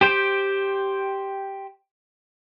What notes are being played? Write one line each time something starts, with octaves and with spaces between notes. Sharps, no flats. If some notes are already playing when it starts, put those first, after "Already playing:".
G4 C5 G5